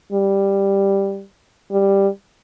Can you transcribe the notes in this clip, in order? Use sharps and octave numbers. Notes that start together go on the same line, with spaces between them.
G3
G3